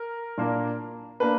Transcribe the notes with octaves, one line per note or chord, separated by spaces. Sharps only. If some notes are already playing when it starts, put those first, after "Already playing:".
Already playing: A#4
A#2 A#3 D4
A#3 D4 B4